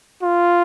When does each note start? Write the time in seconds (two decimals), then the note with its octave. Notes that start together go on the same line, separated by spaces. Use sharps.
0.23 F4